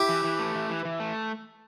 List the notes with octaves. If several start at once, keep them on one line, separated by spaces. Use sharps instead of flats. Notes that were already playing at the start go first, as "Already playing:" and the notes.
Already playing: E4 G4
E3
E3
A3
E3
E3
E3
A3